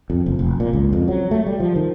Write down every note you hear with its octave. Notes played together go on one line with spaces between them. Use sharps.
F2
F#1
F1
A#2
C#2
F2
F#3
A3
G3
F3
D#3